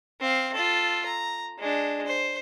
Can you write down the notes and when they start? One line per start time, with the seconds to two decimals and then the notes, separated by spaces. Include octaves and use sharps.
0.20 C4 F5
0.54 F4 A4
1.06 A#5
1.59 G#3 D4
2.07 C5